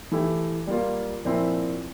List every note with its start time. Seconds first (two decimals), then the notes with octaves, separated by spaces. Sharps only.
0.12 E3 A3 E4 G4
0.67 G3 A#3 F4
1.25 A#2 F3 C4 E4